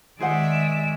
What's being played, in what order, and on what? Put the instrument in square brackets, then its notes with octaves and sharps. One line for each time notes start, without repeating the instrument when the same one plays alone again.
[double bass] D#3 [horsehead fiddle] G#3 [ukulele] G#4 C5 F#5 [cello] D5 E5